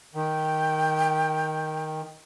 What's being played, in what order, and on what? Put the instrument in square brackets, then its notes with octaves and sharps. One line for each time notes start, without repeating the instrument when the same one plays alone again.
[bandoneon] D#3 [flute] G5